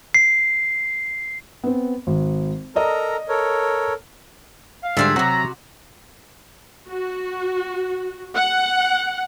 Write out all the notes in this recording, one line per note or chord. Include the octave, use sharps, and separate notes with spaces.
C7
B3 C4
G#1
A4 A#4 D5 D#5 A#5 D#6
A4 A#4 C#5
F5
G#2 D3 F3 G3 D4 E5 G#5
C3 F#3 C4 F#4 F#5 A#5
F#4
F#5